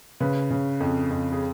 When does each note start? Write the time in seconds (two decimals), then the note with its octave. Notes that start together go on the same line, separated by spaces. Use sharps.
0.20 C#3 B4
0.51 C#3
0.80 F2
1.10 F2
1.32 G#4